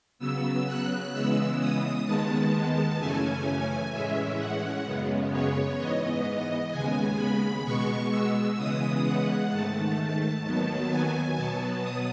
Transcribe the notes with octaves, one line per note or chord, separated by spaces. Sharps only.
C#3 F#3 B3 E6
F#6
C#3 E3 G#3 B3 E6
D#6
D#2 D#3 G#3 B3 A5
F#2 C#3 E3 A3 C#4 G#5
A2 E3 G#3 C#4 E5
F#5
F#2 C#3 G#3 B3
C#5
G#2 E3 B3 D#5
D#2 C#3 G#3 B3 G#5
B5
B2 G#3 B3 C#6
E6
C#3 E3 G#3 B3 D#6
F#5
G#2 D#3 A3 A5
D#2 D#3 F#3 B3 A5
G#5
B2 F#3 B3 A5
D#6